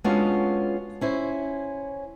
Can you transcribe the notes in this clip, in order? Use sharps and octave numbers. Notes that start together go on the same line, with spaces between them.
G#3 B3 C#4 D4 F4 F#4
C#4 E4 C5